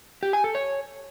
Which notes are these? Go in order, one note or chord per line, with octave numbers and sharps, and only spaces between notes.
G4
G#5
A4
C#5